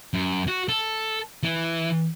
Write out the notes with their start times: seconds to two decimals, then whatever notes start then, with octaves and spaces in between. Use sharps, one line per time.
0.14 F#2
0.48 F#4
0.69 A4
1.43 E3